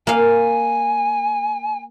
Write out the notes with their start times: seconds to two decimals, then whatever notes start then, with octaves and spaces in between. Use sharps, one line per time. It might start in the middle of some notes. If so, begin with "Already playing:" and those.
0.07 A#3 F5 G#5